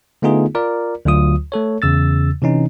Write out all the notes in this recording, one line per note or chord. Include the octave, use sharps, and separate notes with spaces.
D3 A3 B3 D#4 F4 G#4
F4 A#4 D5
D2 D3 F#3 F4 D#6
A3 A4 C#5
E2 C#3 E6 A6
C3 E3 C#4 D#4